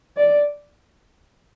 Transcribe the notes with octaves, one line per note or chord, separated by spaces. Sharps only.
D5